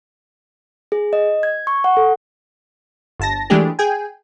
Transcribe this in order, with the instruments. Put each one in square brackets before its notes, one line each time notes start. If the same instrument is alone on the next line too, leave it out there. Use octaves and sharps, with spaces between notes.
[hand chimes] G#4
D#5
G#6
C#6
F#5
A4
[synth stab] G1 A5 A#6
E3 G#3 A3 D4 G4 G#4
G#4 G5 G#5